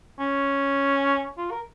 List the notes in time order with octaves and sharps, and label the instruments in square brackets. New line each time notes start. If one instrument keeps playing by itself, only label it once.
[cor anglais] C#4
F4
A#4